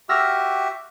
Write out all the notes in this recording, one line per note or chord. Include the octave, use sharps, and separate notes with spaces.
F#4 G4 E5 E6 F6 A#6